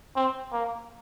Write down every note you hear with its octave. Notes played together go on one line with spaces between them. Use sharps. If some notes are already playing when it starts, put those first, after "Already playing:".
C4
A#3